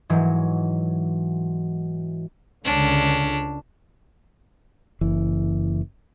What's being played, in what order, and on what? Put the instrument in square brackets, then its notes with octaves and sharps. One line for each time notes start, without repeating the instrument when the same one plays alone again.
[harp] G#2 E3 F#3
[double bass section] C#2 D3 [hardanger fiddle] C#4 D4
[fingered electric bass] F#1 E3